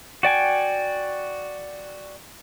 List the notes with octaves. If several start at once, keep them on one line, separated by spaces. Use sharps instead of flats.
F#4 D5 G5 G#5